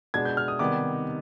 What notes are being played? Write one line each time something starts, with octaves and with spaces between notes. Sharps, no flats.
B2 G#3 B3 D4 G#6
G6
F6
D#6
C3 D#3 G3 B3 D#4 D6